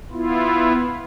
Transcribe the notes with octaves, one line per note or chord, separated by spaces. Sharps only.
B3 E4 F4